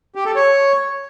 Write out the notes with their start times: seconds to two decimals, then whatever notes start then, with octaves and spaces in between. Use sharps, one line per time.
0.15 G4
0.25 A4
0.36 C#5